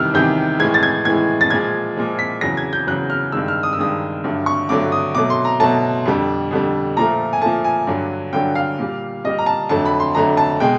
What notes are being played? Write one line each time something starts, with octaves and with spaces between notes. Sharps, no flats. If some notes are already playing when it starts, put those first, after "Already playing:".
Already playing: E2 C3 D#3 G3 E6 F6
E2 C3 D#3 G3 G6
A2 E3 G#3 G#6
A6
G#6
A2 E3 G#3 G#6
A6
A#2 F3 G#3 G#6
A#2 F3 G#3
B6
E2 C#3 F#3 A#6
G#6
G6
E2 C#3 F#3 F#6
F6
G2 D#3 G#3 E6
F6
D#6
E6
G2 D#3 G#3 D#6
G2 D3 F#3 A3
C#6
G2 D3 F#3 A3 D6
D#6
B2 F#3 A3 D6
C6
A#5
B2 F#3 A3 A5
F2 D3 G3
F2 D3 G3
A#2 F3 A3 A#5
G#5
A#2 F3 A3 A5
G#5
G2 D3 F#3
G2 D3 F#3 G5
F5
A#2 G3
A#2 G3 D#5
A#5
A5
F2 D3 F#3 A3 A5
B5
C6
F2 D3 F#3 A3 A#5
A5
B2 G#3 G5